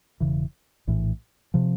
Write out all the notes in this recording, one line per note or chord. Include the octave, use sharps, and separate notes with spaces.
E1 D#2 C#3 E3
A#1 A2 E3
C3 F3